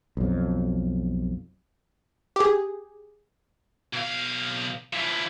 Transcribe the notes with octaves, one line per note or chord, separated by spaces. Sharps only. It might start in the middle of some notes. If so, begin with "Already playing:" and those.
B1 F2
G4 G#4
B1 F5
F3 E4